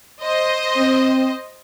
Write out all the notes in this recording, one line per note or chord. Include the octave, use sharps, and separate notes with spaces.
C5 D#5
C4